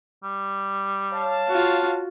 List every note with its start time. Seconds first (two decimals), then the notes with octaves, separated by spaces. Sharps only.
0.23 G3
1.12 C#5 F5 A5
1.48 F4 F#4